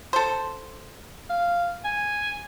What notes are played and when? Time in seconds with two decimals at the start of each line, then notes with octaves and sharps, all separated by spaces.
0.13 A4 C5
1.30 F5
1.84 G#5